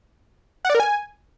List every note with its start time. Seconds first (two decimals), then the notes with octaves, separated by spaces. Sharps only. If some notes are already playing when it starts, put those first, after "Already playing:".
0.65 F#5
0.70 D5
0.75 A#4
0.80 G#5